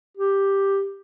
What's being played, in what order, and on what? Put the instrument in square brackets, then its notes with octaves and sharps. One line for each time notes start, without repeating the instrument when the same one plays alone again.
[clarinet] G4